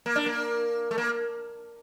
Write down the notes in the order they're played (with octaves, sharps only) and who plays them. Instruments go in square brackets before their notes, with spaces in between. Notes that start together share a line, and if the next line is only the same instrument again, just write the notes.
[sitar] A#3
D4
A#3
A3
A#3